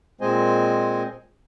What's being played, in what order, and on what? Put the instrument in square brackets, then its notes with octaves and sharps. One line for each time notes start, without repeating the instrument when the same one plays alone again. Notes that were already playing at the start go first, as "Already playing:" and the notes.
[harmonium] A#2 G#3 C4 C5 D#5 G#5